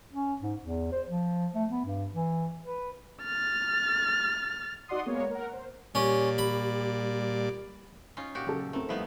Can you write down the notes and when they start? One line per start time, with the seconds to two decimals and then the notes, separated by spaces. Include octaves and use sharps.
0.13 C#4
0.42 G#2
0.63 E2
0.92 C5
1.08 F3
1.55 A3
1.70 B3
1.86 G2
2.15 E3
2.63 B4
3.23 F6 A6
4.88 D#4 F#4 D5 F#5 C6 D#6
5.06 G#3 A#3 B3 C#5
5.31 A#4 F#5
5.53 C5
5.95 A#2 G3 C#4 G4 D5
6.38 B5
8.17 C#4 D#4 F4
8.35 A#2 F#4 G4
8.47 C#3 F#3 A4
8.73 A3 C4 A#4
8.89 F1 C2 F3 B3 D#4 E5